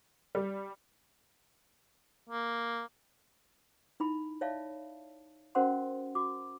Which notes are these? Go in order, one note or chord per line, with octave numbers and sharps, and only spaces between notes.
G3
A#3
D#4 E4 B5
C#5 D5 E5 F5 A5
C#4 F#4 A#4 C5 F#5 C6
F#4 D6